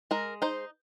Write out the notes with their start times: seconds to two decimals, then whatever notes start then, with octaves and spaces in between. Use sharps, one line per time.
0.11 G#3 A#4
0.42 D#4 C5